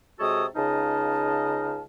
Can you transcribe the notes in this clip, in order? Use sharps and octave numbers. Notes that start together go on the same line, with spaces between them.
C3 G#3 F#4 A4 C#5 D#6
C#2 C#3 D#4 D#5 F5 A5